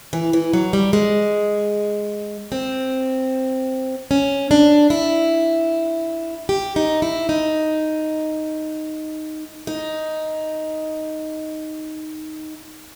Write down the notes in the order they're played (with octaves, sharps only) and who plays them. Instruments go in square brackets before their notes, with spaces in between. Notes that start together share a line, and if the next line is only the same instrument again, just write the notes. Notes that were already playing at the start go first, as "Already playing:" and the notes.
[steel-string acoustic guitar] E3
E3
F#3
G3
G#3
C4
C#4
D4
E4
G4
D#4
E4
D#4
D#4